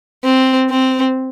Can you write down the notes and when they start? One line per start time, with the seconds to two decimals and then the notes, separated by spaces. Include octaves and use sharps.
0.24 C4
0.70 C4